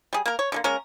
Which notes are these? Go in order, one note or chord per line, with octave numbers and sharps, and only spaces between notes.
G3 G#4
A#3 A#4
C#5
D3 G#3 A#3
G#3 A#3 C#4 A#4